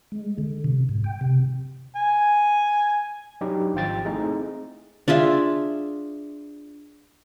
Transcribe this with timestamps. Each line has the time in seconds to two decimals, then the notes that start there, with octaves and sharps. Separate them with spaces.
0.12 G#3
0.38 D3
0.64 C3
0.89 G#2
1.04 G5
1.21 C3
1.96 G#5
3.41 F#3 D4 D#4 G4
3.74 G#1 F3 F4 G5 A6
4.05 A3 C4 D#4 E4 G#4
5.08 D4 F4 G#4 E5